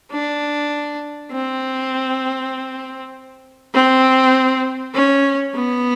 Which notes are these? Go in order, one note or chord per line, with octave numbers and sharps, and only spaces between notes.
D4
C4
C4
C#4
B3